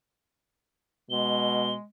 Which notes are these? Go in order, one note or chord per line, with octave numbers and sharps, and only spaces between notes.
B2 G#3 G7